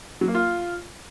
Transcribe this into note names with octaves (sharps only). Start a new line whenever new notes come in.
F#3
A#3
F4